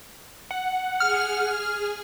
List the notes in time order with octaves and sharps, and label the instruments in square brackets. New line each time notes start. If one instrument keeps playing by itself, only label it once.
[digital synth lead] F#5
[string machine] G#4 [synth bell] F6